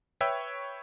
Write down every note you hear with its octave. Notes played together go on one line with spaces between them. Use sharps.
B4 C#5 E5 G5 C#6 E6